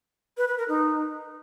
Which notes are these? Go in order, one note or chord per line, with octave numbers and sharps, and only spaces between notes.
B4
B4
A#4
D#4